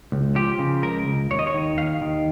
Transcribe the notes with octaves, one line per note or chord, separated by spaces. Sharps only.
C#2
F3 G4
C#3
C#2 A#4
C#2
D#2 C#5
D#5
C#5
D#3
D#2 F5
D#3